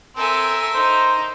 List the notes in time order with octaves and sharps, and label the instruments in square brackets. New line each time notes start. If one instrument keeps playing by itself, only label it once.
[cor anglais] C4 [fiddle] A4 G#5 [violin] A#4 E5
[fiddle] D#4 [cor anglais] C5